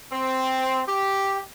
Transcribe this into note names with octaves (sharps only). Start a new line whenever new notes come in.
C4
G4